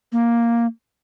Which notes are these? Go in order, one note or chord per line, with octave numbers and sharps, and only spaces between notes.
A#3